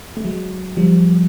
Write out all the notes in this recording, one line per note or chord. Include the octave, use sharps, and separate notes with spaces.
A3
F#3 G#3
F3 G3